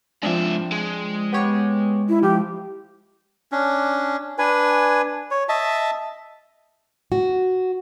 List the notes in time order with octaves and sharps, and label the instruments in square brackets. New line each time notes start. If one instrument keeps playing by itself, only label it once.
[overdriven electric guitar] G#2 E5 [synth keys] F3 C4 D4
[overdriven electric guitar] G#3
[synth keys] B3 G4 C#5
[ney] E4
[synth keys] F3 [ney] G4
[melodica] C#4 D4
D4 B4 G#5
C#5
D#5 E5 A5
[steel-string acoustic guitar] F#4